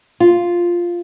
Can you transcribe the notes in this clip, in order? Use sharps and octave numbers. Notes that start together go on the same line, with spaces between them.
F4